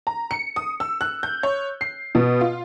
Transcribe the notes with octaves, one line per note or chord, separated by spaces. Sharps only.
A#5
C#7
D#6
E6
F#6
G6
C#5
C7
B2
F4